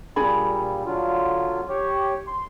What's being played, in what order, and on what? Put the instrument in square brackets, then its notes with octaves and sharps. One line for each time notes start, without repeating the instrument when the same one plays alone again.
[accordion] A#2 G3 [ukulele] D4 G#4 B5
[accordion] D3 F#3 F4
G4 C#5
C6